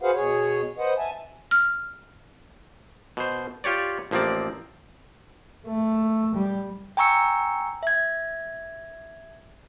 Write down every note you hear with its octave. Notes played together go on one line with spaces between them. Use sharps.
F#4 G#4 B4 C5 F5 F#5
B2 G#4 C#5
B4 C5 D#5 F#5
E5 G#5 A5
F6
B2 C5
F4 G4 C#5 D5
A1 F3 A#3 C4 D5
A3
G3
G5 G#5 A#5 C#6 E6 C#7
E5 G#6